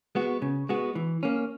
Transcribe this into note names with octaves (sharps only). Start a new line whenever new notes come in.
G#3 B3 F#4
C#3
G#3 B3 F#4
E3
A#3 C#4